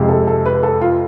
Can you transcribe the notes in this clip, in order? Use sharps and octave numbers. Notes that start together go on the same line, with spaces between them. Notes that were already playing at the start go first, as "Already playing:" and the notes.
Already playing: F2 C3 G#3
A4
A4
B4
A4
F4